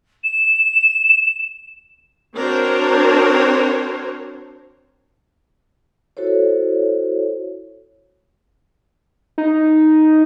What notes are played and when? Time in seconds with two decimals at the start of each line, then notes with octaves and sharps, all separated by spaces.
0.24 E7
2.35 C4 D4 F#4 A#4 C5 C#5
6.17 E4 F#4 A4 C5 C#5
9.38 D#4